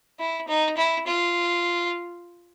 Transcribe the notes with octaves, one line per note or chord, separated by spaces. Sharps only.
E4
D#4
E4
F4